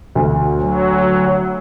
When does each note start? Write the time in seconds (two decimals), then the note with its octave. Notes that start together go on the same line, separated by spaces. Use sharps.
0.15 D2
0.61 F#3